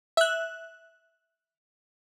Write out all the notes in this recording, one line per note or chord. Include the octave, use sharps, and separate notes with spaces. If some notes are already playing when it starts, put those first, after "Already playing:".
E5 F#6